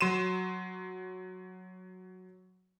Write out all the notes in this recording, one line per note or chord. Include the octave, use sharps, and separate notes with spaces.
F#3 C6 D#7 E7